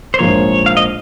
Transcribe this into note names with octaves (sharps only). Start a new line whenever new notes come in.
C5
A#1 G#2 F3 A#3 C#5
F5
D#5